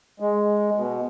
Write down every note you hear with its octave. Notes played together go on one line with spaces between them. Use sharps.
G#3
B2